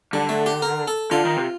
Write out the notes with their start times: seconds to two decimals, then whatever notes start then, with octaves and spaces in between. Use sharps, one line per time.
0.13 D3 G3
0.29 A3
0.46 G4
0.62 A#4
0.88 A4
1.11 D3 F4
1.25 D#3
1.37 C3